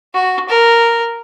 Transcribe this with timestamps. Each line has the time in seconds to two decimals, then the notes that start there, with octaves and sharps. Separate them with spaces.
0.14 F#4
0.49 A#4